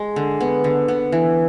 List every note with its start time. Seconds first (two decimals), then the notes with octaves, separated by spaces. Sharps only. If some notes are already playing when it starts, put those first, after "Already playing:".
Already playing: G#3
0.16 D3
0.40 B3
0.64 D3
0.88 B3
1.12 E3